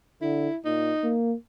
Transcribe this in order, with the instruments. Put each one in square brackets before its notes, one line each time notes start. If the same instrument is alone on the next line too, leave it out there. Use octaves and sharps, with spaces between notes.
[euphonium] D3 [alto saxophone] E4
[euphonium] A#2 [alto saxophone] D#4
[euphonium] A#3